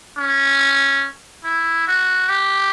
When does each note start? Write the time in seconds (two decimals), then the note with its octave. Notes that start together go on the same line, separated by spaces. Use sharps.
0.17 C#4
1.44 E4
1.88 F#4
2.29 G4